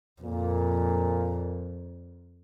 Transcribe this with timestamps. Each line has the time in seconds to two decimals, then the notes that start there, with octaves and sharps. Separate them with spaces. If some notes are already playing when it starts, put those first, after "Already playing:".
0.22 F2 A#2